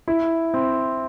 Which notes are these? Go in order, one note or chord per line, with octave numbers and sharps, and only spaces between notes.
E4
C4